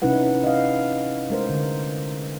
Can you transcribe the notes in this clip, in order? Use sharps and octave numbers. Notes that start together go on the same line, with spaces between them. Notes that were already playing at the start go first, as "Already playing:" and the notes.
C3 C#4 D#4 E4 B4 F#5
D#5 F5
G#3 A3 A#4 C5
D3